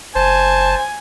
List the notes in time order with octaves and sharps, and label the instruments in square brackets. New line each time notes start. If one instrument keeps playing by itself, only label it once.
[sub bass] F#1 [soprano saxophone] C5 [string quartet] G#5 [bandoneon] A5